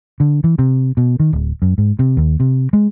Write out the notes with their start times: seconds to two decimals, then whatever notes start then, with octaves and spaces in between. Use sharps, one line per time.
0.20 D3
0.44 E3
0.59 C3
0.97 B2
1.20 D#3
1.33 D1
1.62 F#2
1.78 G#2
1.99 C3
2.17 D#2
2.40 C3
2.73 G#3